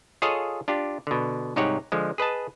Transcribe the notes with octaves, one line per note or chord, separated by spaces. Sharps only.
F4 G#4 A4 C#5 D#5 F5
D4 F4 G4
B2 D3
C2 G#2 D#4 G4 C#5 F#5
D3 F3 G#3
G#4 B4 D#5 A5